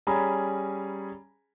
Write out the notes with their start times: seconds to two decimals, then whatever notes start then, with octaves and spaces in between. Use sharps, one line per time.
0.07 G3 C#4 G#4 G#5 A#5 B5